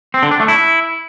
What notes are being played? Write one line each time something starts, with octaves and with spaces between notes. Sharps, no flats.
C4
D3
D4
A3
E4